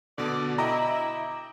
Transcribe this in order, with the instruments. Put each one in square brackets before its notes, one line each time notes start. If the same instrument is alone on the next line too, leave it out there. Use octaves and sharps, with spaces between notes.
[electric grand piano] B2 D3 [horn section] D5
[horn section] E4 [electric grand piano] D#5 G5 D6 [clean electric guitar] A#5